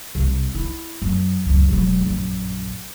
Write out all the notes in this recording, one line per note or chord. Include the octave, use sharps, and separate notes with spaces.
C2
E4
F#2
C#2 F#2
E1 F#3
A#1 F#2